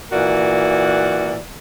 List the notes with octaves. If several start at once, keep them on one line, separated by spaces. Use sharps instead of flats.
A#2 E3 A#3 F#4 D5